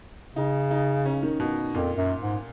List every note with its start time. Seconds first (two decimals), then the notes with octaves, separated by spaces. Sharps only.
0.36 C#3 D#4
0.71 D#4
1.05 C#4
1.23 D#3
1.40 B2
1.74 F2 A#2
1.97 F#2
2.21 G#2